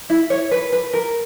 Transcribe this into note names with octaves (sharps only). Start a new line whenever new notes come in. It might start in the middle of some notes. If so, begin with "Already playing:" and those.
E4
C#5
B4
B4
A#4